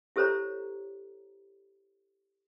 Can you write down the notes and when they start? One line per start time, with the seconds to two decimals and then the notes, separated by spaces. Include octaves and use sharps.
0.16 E4 G4 A4 C5 C#5 A#5